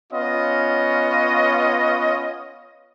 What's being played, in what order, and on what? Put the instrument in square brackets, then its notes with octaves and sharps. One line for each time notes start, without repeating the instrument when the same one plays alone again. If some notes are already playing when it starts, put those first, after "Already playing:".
[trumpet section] B3 C#4 F4 C#5 D#5